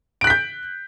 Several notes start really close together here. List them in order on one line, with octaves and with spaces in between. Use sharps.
D7 F#6 B6 G6